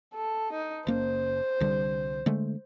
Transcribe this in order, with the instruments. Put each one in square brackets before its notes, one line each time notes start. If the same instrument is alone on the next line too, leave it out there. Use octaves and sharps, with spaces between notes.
[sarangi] A4
D#4
[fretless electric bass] F#1 A#3 C#4 [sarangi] C5
[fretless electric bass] C2 D3 G3
D3 G#3 A3